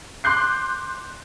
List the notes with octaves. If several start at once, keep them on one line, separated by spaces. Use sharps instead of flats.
C6 D6 F#6 G6 C7